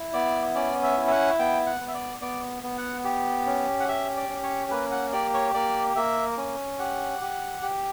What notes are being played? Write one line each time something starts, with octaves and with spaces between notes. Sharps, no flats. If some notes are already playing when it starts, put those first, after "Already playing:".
Already playing: E4
B3 D5
C#4 D5
E5
E4
E5
F#5
B3 G5
F#5
B3
E5
D5
B3 D5
B3
F#5
G4
C#4
F#5
G4 E5
D5
C#4
C#5
A#3 B4
F#5
G4 D5
C#5
A#3 D5
A#3 E5
C#4
G4 F#5
G4
G4